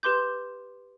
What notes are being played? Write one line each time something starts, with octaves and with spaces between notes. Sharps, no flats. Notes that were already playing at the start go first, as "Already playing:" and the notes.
G4 B4 C6 D6 G6